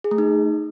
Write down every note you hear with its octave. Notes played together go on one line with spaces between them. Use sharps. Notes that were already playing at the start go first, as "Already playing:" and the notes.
G#4
A3
D#4